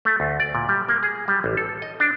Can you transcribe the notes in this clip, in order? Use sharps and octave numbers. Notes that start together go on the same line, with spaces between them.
A3
D2
D5
A#2
G3
A#3
G#4
G3
A1
A4
D#5
D4